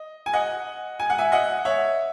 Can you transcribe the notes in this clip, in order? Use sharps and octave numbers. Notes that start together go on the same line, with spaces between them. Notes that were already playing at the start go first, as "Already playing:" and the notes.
Already playing: D#5
G#5
D#5 F#5
G#5
F#5
E5 G#5
D#5 F#5
C#5 E5